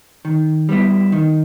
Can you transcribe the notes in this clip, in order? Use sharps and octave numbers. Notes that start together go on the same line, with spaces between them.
D#3
G3 B3 E4
D#3